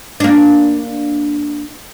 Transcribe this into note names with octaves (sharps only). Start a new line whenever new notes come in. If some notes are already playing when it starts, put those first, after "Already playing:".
A#3 D4